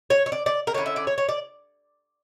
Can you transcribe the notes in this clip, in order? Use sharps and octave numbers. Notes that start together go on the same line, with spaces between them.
C#5
C#5
D5
D5
A#4
D3 A3 C#4 E4 C#5
E5
D5
C#5
C#5
D5